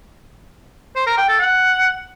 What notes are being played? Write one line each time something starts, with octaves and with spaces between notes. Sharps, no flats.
C5
A#4
G5
A4
F#5